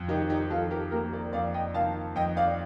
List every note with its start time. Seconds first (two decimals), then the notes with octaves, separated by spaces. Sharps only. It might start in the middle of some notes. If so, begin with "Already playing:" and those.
Already playing: F2
0.08 D#3 D#4 G4
0.29 D#4 G4
0.50 F2 F4 A4
0.71 G4 A#4
0.91 A#3 G4 A#4
1.13 A#4 D5
1.33 F2 D5 F5
1.54 D#5 G5
1.74 D#3 F5 A5
2.16 F2 D#5 G5
2.37 D5 F5